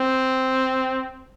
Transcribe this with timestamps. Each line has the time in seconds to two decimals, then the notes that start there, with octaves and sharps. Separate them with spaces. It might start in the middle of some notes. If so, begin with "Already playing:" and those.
Already playing: C4